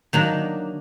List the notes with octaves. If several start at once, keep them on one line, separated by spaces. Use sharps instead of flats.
D#3 F#3 A#3 D4